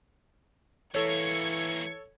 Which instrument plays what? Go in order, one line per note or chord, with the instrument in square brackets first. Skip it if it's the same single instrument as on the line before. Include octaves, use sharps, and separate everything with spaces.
[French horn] E3 [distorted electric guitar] A3 A#3 [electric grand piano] A4 C#5 [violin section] G#6 C#7